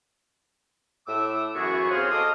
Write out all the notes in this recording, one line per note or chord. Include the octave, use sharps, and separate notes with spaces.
A2 A3 D6 E6
F#2 E3 B3 F#4 G#4 C#6
F3 C4 F4 G#4 C#5 C6
A4 D#5 F5 C6 D6 D#6